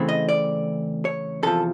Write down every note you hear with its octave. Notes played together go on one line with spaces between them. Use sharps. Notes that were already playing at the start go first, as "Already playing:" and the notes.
Already playing: C#3 E3 A3 C4
D#5
D5
C#5
E2 C3 F3 A4